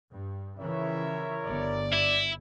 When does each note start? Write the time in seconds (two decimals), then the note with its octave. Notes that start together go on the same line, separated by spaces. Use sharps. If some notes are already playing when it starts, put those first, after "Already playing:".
0.12 G2
0.59 C#3 E3 F3 G3 E4 A#4 C#5 E5
1.45 G1 D5
1.93 E4